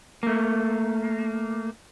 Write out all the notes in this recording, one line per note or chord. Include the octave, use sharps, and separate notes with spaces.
A3 A#3